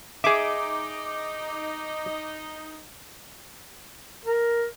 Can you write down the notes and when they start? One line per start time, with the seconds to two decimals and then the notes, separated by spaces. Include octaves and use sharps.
0.24 D#4 G#4 E5 D6
4.25 A#4